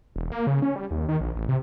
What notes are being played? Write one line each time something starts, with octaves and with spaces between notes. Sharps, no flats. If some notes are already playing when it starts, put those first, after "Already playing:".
E1
A#3
C#3
C#4
G3
D#2
D#3
A#1
A1
C3